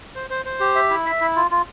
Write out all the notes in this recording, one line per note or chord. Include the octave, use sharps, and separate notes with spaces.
C5
C5
C5
G4
E5
E4
E5
E4
F4
F4